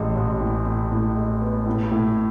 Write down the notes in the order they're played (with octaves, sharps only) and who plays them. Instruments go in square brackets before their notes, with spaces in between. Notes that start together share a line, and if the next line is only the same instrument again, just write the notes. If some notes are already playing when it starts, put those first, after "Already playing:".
Already playing: [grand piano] A1 G#3
A1
A2
A2
A2
G#3
B3
A2
A2